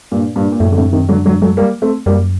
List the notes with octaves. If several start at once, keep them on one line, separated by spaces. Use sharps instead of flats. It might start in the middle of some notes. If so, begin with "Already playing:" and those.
G2 A#2
G2 A#2
A#2
F#2 A2
D3
A2 C3
C3 D#3
D3 F#3
D3 F#3
F#3 A3
G3 A#3
A3 C4
F#2 G3 A#3